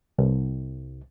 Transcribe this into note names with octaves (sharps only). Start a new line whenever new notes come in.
C2